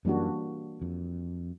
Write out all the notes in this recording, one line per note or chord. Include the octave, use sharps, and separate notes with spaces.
F#2 E3 G3 A#3 D4 F#4
F2